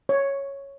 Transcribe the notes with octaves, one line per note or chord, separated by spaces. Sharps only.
C#5